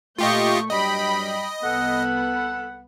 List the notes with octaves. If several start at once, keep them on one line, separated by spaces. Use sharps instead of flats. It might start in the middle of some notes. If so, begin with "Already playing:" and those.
A#2 A3 F4 G4 D#5 C#6 G6
G2 F#3 G3 D#5 G5 B5
C2 B3 A4 F#5 B5